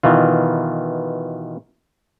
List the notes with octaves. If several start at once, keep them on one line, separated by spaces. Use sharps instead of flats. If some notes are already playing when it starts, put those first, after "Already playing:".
B2 D#3 E3 F4